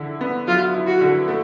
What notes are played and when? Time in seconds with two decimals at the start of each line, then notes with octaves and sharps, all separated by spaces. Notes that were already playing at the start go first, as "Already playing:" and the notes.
Already playing: D3 E4
0.21 B3
0.47 F#3 F4
0.74 E4
0.87 F#4
1.01 D3
1.28 A3